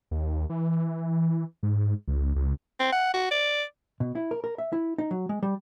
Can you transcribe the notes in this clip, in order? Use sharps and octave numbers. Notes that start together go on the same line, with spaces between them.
D#2
E3
G#2
C#2
C#2
C4
F#5
F#4
D5
B2
E4
A#4
A#4
E5
E4
D#4
F#3
G#3
G3